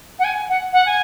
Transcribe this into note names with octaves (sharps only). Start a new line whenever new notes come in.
F#5
G#5
F#5
F#5
G#5